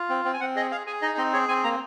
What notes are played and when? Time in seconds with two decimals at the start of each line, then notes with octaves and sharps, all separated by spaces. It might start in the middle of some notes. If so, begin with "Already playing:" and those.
Already playing: F4
0.09 C4
0.25 C4
0.34 G#5
0.40 C4 F#5
0.56 G#4 D#5
0.71 G#4 F5
0.87 G#4 G#5
1.02 D#4 D#5
1.18 C4 D#5
1.33 G#4 C#5
1.48 C4 G#5
1.64 A#3 A#5